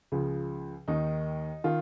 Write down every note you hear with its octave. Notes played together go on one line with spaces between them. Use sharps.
C#2 C#3 F3
D#2 D#3 D#4
D#3 F4